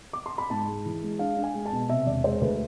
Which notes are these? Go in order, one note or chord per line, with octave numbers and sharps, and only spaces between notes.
D6
C6
B5
G#2 A5
G#3
E3
G#3
D4 F5
D4
G#5
G#3
A5
B2
C3 E5
E1 D5
G#3 C5
D2 B4